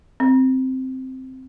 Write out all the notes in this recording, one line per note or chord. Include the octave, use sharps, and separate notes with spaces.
C4